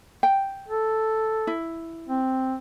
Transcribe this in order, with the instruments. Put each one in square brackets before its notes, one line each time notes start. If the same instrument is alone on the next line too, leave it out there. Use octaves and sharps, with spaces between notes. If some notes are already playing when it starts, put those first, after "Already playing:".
[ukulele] G5
[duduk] A4
[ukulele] E4
[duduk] C4